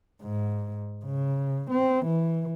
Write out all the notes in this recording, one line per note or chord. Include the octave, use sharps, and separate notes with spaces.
G#2
C#3
C4
E3